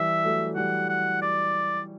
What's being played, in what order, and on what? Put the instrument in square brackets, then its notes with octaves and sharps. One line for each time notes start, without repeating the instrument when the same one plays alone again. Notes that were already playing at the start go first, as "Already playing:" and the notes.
Already playing: [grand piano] E3 G3 [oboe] E5
[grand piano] F#3 A3
[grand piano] E3 G3 [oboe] F#5
[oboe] F#5
D5